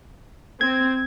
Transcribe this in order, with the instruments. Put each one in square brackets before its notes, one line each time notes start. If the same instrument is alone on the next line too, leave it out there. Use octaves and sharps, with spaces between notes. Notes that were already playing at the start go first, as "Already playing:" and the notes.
[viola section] C4 [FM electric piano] G#6